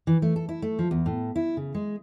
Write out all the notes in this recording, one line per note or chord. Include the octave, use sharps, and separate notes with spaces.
E3
A3
A4
E4
A3
F3
E2
A2
E4
C#3
G#3